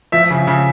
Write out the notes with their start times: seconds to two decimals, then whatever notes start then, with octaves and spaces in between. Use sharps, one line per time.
0.12 F3 E5
0.30 C#3
0.47 C#3